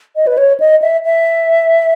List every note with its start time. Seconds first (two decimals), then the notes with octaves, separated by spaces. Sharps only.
0.16 D#5
0.27 B4
0.38 C#5
0.60 D#5
0.82 E5
1.04 E5